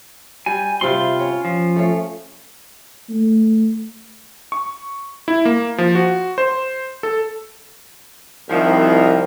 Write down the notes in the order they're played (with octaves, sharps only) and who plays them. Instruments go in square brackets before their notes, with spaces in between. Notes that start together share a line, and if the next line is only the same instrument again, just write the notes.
[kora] G3 [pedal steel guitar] G#5
[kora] C3 G3 C4 [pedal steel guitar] F4 C6
[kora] C#4
[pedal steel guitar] F3
[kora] A3 C#4
[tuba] A3
[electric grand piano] C#6
E4
A#3
F3
F#4
C5
A4
[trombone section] C2 [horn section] D#3 F3